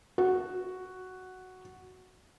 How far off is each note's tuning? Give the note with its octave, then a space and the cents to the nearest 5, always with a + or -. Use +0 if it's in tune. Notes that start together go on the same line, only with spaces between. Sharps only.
F#4 +0